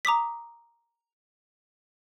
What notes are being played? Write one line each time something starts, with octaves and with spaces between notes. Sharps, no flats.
A#5 D6 D#6 B6